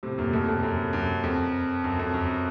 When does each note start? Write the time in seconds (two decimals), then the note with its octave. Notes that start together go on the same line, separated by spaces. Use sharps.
0.03 A2 C3
0.18 F#2 A#2
0.33 F2 A2
0.48 F2 A2
0.63 F#2
0.93 F#2
1.24 F2
1.84 F#2
1.99 F2
2.14 F#2